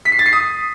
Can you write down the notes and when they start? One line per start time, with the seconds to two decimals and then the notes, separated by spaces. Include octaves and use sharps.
0.05 B6
0.12 C7
0.19 A6
0.26 C7
0.33 D#6